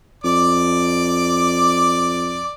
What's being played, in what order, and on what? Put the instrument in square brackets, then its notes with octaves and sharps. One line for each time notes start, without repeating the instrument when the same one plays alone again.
[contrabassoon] F2 [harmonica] D5 D6